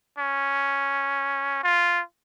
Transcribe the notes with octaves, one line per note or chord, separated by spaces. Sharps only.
C#4
F4